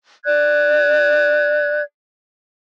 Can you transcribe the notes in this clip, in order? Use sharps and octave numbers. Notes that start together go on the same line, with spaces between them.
D5 F#6 G#6